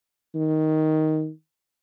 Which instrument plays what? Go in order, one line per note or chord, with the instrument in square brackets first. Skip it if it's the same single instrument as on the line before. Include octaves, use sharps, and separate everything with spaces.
[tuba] D#3